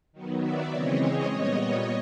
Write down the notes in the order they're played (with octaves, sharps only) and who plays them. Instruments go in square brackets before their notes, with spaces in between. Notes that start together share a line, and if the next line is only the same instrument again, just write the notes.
[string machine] D#3 F#3 B3
D5 E5
C#3 E3 G#3 C4 C#5 D#5
C#5 D#5
A#2 G3 B3